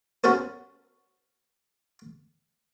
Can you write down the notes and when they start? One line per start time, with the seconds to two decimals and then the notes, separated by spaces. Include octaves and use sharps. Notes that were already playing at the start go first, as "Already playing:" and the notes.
0.24 C#4 F#4 A4 A#4 C5